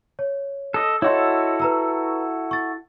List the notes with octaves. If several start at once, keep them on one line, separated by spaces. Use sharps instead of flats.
C#5
A4 D#5
E4 F#4 A4 C#5 D#5 C6
B4 A#5 E6
C#6 A6